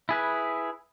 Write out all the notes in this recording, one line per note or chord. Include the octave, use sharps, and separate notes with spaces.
E4 G#4 B4